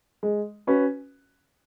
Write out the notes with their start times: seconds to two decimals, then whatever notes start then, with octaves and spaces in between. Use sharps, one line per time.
0.23 G#3
0.67 C#4 F#4 B4